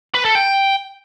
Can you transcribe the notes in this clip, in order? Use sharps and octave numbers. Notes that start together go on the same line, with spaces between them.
B4
A4
G5